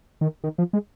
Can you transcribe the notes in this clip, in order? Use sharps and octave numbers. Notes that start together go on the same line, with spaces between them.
D#3
D#3
F3
G#3